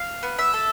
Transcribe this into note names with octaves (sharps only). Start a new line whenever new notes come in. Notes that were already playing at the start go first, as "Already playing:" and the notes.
Already playing: F5
B3
E5
A4